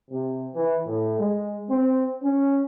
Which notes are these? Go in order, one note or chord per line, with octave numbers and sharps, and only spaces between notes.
C3
E3
A2
G#3
C4
C#4